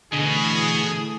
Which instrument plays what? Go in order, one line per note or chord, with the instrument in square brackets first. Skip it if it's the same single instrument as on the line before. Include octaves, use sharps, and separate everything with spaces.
[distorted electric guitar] B2 [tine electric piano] D3 D4 [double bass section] E3 A3 [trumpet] G#4